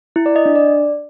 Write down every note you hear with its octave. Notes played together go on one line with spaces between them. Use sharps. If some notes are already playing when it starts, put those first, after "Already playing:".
E4
D5
D#5
D4
D5